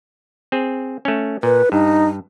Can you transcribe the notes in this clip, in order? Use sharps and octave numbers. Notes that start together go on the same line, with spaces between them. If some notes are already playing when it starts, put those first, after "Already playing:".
C4 G#4
A3 C#4
A#2 B4
G2 D#4